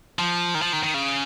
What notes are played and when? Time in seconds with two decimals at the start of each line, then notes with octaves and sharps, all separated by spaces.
0.19 F3
0.55 D#3
0.62 F3
0.73 D#3
0.83 D#3
0.94 C#3